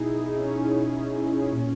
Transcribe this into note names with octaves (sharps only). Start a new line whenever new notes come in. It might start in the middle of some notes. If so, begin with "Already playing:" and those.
Already playing: B2 D#4 E4 G#4
D#4
C#4
A#2